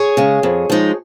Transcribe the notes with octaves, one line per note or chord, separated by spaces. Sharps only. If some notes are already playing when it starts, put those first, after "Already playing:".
Already playing: G#4 C#5
C#3 G#3
F2
F3 G#3 D#4